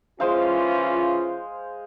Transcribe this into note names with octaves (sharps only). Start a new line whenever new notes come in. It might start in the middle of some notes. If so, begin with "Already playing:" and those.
E3 G#3 C#4 F4 C5 F5